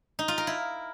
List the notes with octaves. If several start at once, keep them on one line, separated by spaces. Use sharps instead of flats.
D#4
F4
A#4
E4